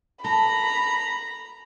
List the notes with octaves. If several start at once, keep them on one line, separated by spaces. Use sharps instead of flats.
A4 A#5 B5